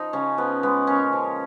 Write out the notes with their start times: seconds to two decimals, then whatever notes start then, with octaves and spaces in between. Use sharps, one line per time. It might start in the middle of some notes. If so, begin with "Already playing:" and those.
Already playing: F3 D#4
0.13 C#3 C#4
0.38 F3 B3
0.63 G#3 B3
0.87 A#2 C#4
1.13 F3